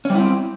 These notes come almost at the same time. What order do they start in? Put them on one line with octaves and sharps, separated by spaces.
C#4 G3 E4 C4